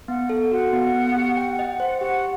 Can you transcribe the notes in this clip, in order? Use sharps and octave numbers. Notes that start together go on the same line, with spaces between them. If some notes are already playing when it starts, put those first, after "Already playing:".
B3 F#5
A4
F#4 F#5
B3
B3
G4
G5
D#5
C5 F#5
G4 F#5